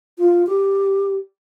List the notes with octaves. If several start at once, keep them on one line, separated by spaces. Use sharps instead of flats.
F4
G4